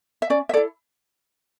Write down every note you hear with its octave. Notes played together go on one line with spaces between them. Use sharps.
E5
C#4 D5
E5
E4 A4 D5